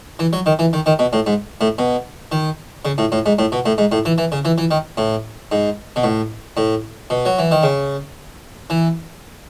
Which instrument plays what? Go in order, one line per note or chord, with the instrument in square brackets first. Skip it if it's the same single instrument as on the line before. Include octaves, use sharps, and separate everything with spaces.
[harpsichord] E3
F#3
D#3
E3
D#3
D#3
B2
A2
G#2
A2
B2
D#3
C#3
A2
A2
G#2
A2
B2
A2
G#2
A2
E3
E3
C#3
E3
E3
D#3
A2
G#2
B2
A2
A2
B2
F#3
E3
D#3
C#3
E3